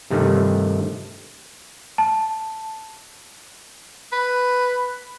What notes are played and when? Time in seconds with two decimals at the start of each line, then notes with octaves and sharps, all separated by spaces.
0.10 G2 C3 D#3 A3
1.98 A5
4.12 B4